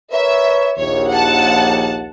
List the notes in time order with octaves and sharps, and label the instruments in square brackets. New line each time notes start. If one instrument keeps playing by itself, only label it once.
[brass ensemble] A#4 B4 C#5 [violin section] E5
[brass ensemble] A#1 D#2 [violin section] C#5
[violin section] F#5 A5